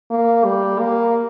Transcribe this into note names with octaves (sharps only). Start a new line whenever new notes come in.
A#3
G3
A#3